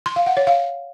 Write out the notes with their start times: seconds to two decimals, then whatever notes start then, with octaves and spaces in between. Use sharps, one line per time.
0.06 C6
0.16 F5
0.26 F#5
0.37 C#5
0.47 F5